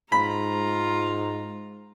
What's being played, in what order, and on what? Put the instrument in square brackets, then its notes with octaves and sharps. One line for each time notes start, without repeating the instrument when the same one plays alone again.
[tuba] G#2 [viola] F4 A#5 [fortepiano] B5